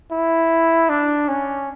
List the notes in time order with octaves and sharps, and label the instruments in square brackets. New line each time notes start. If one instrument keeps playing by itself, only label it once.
[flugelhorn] E4
D4
C#4